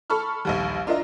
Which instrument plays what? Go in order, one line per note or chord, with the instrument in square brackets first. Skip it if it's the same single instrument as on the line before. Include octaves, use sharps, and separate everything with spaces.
[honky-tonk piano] A4 A5 B5 C#6 F6
A#1 D#2 G3
D4 F4 A#4 D#5 E5 A#5